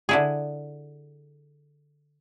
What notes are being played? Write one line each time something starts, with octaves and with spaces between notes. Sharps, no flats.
D3 E4 G#4